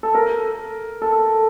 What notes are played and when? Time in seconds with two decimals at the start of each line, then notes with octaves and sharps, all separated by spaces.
0.03 A4
0.15 A#4
1.02 A4